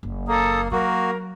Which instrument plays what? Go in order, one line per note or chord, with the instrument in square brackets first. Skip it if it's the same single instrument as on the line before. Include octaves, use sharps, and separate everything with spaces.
[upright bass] F#1
[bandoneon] A#3 [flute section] A4 A#5 D#6
[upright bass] F#3 [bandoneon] A#3 F#4 [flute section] A#4